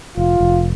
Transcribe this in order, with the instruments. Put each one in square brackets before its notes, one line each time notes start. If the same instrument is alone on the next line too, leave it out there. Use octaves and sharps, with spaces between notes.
[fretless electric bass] F1 [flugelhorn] F4
[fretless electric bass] F1